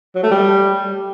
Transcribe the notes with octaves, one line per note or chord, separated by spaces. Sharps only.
F#3
A3
G3